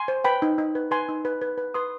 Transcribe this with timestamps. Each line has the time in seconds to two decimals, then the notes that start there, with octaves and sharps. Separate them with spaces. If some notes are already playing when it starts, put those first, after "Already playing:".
Already playing: G#5 C6
0.08 C5
0.24 B4 G5 B5
0.42 D#4
0.58 D#4
0.75 B4
0.91 B4 G#5 C6
1.09 D#4
1.25 B4
1.42 B4
1.58 B4
1.74 B4 C6 D#6